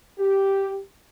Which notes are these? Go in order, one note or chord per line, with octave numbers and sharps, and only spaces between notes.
G4